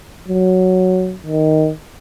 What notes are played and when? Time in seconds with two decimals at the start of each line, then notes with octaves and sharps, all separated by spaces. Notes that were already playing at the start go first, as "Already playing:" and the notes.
0.28 F#3
1.26 D#3